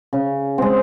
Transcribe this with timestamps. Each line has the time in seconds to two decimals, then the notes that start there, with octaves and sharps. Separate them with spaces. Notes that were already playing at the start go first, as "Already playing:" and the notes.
0.13 C#3
0.58 G#3 C4